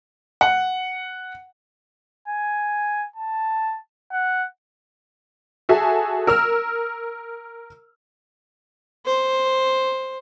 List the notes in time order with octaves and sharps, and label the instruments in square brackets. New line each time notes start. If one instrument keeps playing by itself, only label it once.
[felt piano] F#5
[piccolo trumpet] G#5
A5
F#5
[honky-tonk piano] F#4 G#4 A4 E5 G#5
A#4 E6 F6
[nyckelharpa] C5